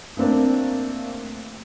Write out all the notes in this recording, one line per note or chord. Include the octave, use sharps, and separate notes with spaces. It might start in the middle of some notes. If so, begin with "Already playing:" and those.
A3 A#3 C4 D4 A#4